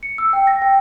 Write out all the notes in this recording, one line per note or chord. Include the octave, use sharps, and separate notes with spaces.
C#7
E6
G5
A#6
G5